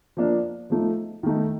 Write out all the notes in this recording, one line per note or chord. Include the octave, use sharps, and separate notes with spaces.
F3 A#3 D4
F3 A3 D#4
D#3 A3 D#4